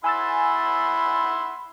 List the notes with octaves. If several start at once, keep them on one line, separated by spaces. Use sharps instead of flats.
E4 F#5 G#5 B5 C6 E6 A6